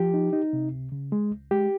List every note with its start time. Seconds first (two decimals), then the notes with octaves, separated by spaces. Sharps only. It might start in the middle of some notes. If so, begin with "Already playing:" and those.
Already playing: F3 G4
0.14 D#4
0.33 D#4
0.53 C3
0.72 C#2
0.92 C#3
1.12 G#3
1.31 C#2
1.51 G#3 G4